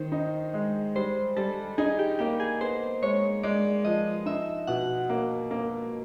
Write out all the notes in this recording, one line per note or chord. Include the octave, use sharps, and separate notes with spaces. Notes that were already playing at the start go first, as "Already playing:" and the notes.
Already playing: D#3 C5
D#4
G#3
G3 C5
G3 A4
D#4 G#4
G4
A#3 G4
G#4
B3 C5
G#3 C#5
G#3 D5
F3 D#5
D#4 E5
B2 F#5
A#3
A#3